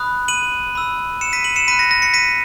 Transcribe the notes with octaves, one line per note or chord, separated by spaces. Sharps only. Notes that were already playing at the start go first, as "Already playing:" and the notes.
Already playing: B5 D#6 F#6
D#7 F#7
B5 E6
C#7 E7
B6 D#7
D#7 F#7
C#7 E7
B5 F#6 B6 D#7
A#6 C#7
A#6
A#6 C#7
B6 D#7